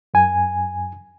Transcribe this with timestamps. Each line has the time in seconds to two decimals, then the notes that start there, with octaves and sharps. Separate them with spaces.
0.14 F#2 G#5